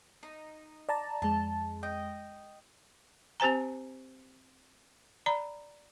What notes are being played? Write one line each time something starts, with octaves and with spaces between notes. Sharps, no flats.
D#4
D5 A5 A#5
F2 G#3 A5
D#5 G5
C4 G4 C5 G#5 A#5
D5 A#5 B5